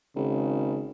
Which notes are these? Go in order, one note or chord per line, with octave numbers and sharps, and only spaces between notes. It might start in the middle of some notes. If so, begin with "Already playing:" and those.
G#1 C#3